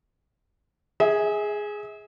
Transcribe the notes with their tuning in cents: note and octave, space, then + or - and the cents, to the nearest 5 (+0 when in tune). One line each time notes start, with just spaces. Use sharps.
G#4 +0 E5 -40